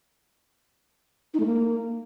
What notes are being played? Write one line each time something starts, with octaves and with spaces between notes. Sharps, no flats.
D#4
A3
A#3